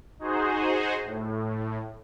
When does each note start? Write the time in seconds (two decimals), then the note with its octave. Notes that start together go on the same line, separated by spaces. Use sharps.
0.19 D#4 F#4 G#4 C5
1.04 A2